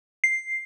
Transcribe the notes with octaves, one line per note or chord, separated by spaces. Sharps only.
C7